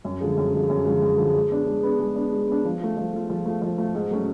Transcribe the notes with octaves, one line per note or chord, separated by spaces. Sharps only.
F#2
D3 F3 G#3
F#2
D3 F3 G#3
F#2
D3 F3 G#3
F#2
D3 F3 G#3
G#3
B3 D4
G#3
B3 D4
G#3
B3 D4
G#3
B3 D4
F3
A3 F4
F3
A3 F4
F3
A3 F4
F3
A3 F4
G#2
F#3 A3 C#4